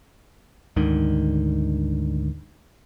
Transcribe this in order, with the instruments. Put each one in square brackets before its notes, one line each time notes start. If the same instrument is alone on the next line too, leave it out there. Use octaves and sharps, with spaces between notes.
[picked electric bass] D2 G#2 D3 D#3